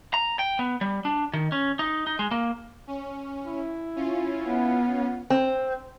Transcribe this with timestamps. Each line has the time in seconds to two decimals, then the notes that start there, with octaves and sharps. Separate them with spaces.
0.14 A#5
0.39 G5
0.59 B3
0.81 G3
1.05 D4
1.33 D#3
1.52 C#4
1.79 D#4
2.07 D#4
2.19 G#3
2.31 A#3
2.87 C#4
3.45 E4
3.96 C#4 F4
4.46 B3
5.30 C4